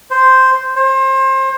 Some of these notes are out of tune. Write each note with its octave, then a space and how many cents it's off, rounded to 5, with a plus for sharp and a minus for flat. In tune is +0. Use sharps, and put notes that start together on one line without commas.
C5 -5
C5 +30